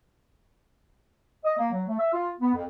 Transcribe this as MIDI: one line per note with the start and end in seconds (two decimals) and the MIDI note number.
1.44 1.56 75
1.58 1.68 58
1.71 1.83 54
1.87 1.98 57
1.99 2.11 76
2.13 2.30 65
2.40 2.54 59
2.55 2.64 41